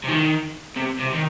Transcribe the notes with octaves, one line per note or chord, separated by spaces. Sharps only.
C3
D#3
C3
C3
D#3